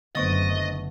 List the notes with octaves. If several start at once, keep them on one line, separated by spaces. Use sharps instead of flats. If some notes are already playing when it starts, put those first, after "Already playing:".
F#1 D3 A3 B3 C5 D#5 C#6 A6